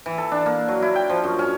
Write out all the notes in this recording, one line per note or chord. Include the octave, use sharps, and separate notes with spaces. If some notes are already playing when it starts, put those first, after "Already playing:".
E3
A4
D4
A#3
F#3
E4
G5
F3
F#2
C#4